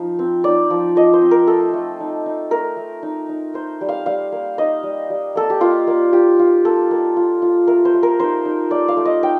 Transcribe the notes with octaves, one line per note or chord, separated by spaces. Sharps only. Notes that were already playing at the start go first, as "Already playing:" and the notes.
Already playing: F3 D#4
C4
D#4 D5
F3
F3 D#5
C5
C4
A#4
A3 A4
A3
D#4
D#4
A3 A#4
A3
D#4
D#4
D#4 C5
G3
F5
G3 F5
A#3
D#4 D#5
G3
G3
A#3 A4
G4
A#3 F4
A#3
F4 G4
F4
A#3 A4
A#3
F4
F4
A3 A#4
C5
A3
A#4
D#4 C5
D#4
A3 D5
F5
A3
D#5
D#4 G5